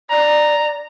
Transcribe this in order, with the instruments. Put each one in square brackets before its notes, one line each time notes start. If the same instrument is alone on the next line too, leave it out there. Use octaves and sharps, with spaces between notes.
[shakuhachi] D5 [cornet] A#5